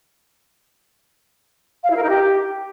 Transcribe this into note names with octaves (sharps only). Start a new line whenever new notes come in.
F5
E4
A#4
D#4
G4